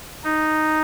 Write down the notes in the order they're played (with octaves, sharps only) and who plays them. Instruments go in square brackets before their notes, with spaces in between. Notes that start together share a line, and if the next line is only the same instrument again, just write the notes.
[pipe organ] D#4